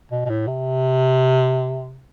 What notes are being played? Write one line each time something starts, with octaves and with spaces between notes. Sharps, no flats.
B2
B2
A2
C3